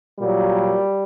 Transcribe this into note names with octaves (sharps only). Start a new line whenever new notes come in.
A#2 F#3 G3